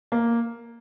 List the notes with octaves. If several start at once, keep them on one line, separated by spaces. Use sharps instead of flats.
A#3